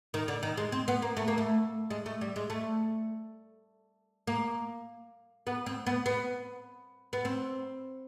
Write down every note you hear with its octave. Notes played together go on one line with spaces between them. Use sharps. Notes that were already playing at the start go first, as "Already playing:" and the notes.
D#3
D3
D#3
G#3
C4
B3
A#3
A3
A#3
A3
G#3
A3
G3
G#3
A3
A#3
B3
C4
B3
B3
B3
C4